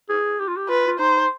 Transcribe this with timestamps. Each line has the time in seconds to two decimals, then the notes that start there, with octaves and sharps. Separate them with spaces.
0.09 G#4
0.39 G4
0.48 F4
0.57 G4
0.69 F4 B4
0.88 F4
0.99 D#4 C5